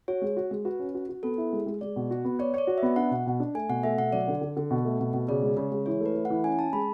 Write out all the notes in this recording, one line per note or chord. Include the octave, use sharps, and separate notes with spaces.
F#4 C#5
G#3
F#4
G#3
F#4 B4
C#4
F#4
F#4
B3 A4
E4
G#3
G#3
G#3 D5
B2
F#4
B3
C#5 D5
C#5 D5
F#4
E5
B3
D4 F#5
B2
B2
D4
A3 G#5
B2 F#5
A3 E5
B2 F#5
F#3 D5
D3
D3
D3
B2
A3
B2
B2
C#3 D5
G#3
C#3
G#3
E3 C#5
A3 B4
A3
F#5
E3
C#4 G#5
C#4 A5
G#3 B5